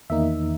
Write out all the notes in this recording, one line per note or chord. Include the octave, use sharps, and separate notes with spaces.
E2 D#3 A#3 D#4 E5